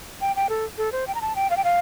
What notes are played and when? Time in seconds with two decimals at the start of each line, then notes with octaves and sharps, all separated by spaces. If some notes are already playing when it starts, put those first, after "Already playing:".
0.21 G5
0.36 G5
0.49 A4
0.78 A4
0.92 C5
1.07 G5
1.15 A#5
1.21 A5
1.36 G5
1.50 F5
1.57 G5
1.64 F5